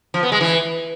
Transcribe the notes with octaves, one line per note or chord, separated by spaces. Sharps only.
F3
B3
G#3
E3